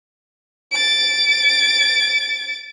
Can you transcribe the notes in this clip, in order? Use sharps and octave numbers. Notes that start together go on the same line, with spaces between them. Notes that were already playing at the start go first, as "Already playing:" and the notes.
A6 D7